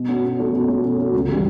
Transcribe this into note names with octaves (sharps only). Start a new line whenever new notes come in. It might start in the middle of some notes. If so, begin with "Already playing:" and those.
Already playing: B2
A3 C#4 F#4
B2
A3 C#4 F#4
B2
A3 C#4 F#4
B2
A3 C#4 F#4
C#2
C#3 G3